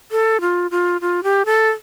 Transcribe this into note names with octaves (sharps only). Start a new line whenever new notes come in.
A4
F4
F4
F4
G4
A4